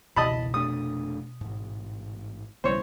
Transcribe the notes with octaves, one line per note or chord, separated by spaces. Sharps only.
F1 C#2 B2 E3 D#5 A5 B5
F1 A3 D4 D#6
A1 G#2
B1 C#3 E3 G3 B3 C5 C#5